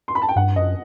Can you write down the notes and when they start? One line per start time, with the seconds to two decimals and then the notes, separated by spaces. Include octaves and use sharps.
0.08 C6
0.15 B5
0.22 A5
0.29 G5
0.36 G2 F#5
0.56 F#2 D#5